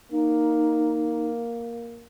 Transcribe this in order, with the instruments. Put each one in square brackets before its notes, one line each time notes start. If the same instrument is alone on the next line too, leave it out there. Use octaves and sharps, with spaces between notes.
[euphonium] A#3 [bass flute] D#4